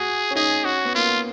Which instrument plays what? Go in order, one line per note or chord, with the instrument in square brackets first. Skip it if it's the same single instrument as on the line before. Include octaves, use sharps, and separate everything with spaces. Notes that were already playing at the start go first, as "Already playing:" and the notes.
Already playing: [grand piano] F#4 [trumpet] G#4
[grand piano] C#4
[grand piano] D#4 [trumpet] G#4
[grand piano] C#4 [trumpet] F#4
[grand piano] B3
[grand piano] A#3 [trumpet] F4